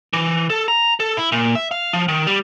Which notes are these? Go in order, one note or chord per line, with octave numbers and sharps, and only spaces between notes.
E3
A4
A#5
A4
E4
A#2
E5
F5
F3
D#3
G3